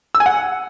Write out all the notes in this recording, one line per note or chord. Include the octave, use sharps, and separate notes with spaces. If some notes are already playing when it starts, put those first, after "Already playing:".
E6
G#5
F#5